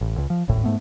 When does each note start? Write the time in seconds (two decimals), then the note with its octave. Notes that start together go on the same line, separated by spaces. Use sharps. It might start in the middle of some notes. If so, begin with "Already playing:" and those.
0.01 A1
0.17 C#2
0.30 F3
0.48 D#1 G#1 A2
0.64 G#2 A3 B3